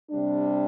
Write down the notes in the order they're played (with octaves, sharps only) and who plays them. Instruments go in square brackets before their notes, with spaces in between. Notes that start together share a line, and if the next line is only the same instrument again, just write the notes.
[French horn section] C3 G3 D4